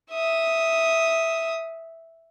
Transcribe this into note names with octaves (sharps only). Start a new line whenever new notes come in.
E5 D#6